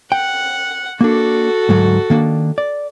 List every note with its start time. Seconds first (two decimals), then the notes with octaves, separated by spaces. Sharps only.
0.12 F#5 G5
1.01 A#3 D4 F#4 A4
1.69 D2 G#2 F#3
2.10 D#3 A#3 D4
2.58 D5